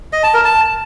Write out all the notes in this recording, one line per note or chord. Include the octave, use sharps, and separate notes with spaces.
D#5
A5
A#4
A5